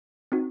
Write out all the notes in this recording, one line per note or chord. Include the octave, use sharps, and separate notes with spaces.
C4 D#4 F#4